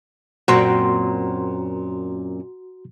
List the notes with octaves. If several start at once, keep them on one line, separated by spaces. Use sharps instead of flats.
F#2 A#2 C4 F#4 A#5 C6